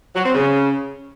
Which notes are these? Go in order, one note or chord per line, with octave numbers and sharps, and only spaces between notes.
F#3
C4
C#3